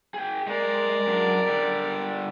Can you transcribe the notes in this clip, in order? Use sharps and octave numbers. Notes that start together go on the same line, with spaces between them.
G#4 G5
G#3 A#4 D5
F#2 D4
D3 G3